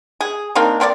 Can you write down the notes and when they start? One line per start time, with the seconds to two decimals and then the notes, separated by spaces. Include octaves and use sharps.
0.21 G#4
0.55 A#3 C4 D4 D#4
0.80 A#3 C4 C#5 D5